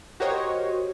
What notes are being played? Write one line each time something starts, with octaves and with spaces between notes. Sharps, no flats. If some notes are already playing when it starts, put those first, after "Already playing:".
F#4 G4 A#4 C5 C#5 D#5